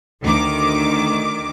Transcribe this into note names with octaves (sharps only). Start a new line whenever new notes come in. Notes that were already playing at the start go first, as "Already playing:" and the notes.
D2 D#3 D6